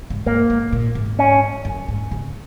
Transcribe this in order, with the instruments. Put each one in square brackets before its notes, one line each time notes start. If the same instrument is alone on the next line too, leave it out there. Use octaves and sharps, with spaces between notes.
[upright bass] G#2
[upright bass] G#2 [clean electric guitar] A#3
[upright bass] G#2
A#2
G#2
[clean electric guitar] C#4
[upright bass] F#2
G#2
C#3